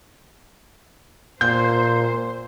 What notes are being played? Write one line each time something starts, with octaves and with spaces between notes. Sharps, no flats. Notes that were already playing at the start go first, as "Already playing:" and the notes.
A#2 C5 G6